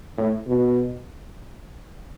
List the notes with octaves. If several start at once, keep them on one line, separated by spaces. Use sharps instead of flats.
A2
B2